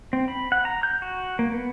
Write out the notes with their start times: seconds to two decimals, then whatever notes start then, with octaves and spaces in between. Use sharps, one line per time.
0.13 C4
0.28 B5
0.52 F#5
0.65 A#5
0.83 G6
1.02 F#4
1.39 A#3
1.52 B3